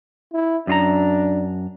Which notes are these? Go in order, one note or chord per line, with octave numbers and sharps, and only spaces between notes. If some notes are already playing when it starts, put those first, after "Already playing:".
E4
F#2 D4 F4 A#5